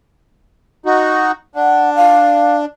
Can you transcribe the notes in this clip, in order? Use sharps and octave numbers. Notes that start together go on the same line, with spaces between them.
D#4 F#4
D4 F#5
F5